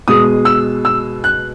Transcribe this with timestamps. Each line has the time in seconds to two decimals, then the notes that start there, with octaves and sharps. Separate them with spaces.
0.08 B2 G#3 D#6
0.45 E6
0.85 E6
1.24 F#6